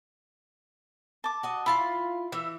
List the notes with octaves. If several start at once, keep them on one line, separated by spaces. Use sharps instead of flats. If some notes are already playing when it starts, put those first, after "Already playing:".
A5 D6
F#4 D#5
E4 F4 F5 B5
E3 E5